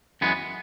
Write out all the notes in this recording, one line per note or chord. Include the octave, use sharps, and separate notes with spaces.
F#2 E3 G#3 B3